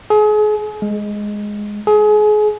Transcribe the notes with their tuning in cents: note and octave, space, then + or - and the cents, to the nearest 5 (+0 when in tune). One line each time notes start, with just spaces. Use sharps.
G#4 +35
G#3 +0
G#4 +30